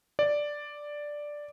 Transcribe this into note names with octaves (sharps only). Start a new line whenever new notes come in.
D5